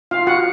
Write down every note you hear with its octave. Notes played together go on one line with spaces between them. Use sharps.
F4 F5
F#4 F#5